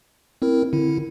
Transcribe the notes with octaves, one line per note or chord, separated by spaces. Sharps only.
C4 E4 A#4
D3 E4